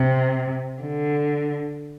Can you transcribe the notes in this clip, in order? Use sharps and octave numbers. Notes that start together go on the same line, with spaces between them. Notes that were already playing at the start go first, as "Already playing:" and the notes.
Already playing: C3
D3